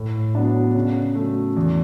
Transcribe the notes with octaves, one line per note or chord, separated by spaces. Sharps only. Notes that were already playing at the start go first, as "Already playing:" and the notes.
Already playing: A2
F#3 B3 D4
C#3
F#3 A3
E2